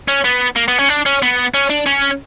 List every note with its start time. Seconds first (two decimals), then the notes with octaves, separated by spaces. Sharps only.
0.08 C#4
0.24 B3
0.56 A#3
0.68 B3
0.79 C#4
0.89 D4
1.06 C#4
1.22 B3
1.54 C#4
1.70 D4
1.87 C#4